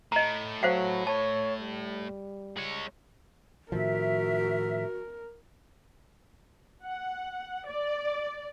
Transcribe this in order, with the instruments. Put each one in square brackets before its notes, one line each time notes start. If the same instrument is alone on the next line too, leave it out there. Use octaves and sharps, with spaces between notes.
[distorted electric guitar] A2 [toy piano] D#5 A#5
[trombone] F#3 [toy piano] C5 F5 F#5
[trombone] C#5 [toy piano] A5
[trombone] G3
[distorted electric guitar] G#3 C#5
[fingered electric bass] A2 D#3 F3 [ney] F#4 [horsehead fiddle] A#4 [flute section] E5
[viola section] F#5
D5